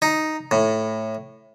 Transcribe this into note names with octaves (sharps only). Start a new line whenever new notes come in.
D#4
A2